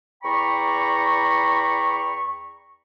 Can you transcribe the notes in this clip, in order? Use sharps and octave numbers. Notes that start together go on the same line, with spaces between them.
E2 D5 G5 A#5 B5 C#6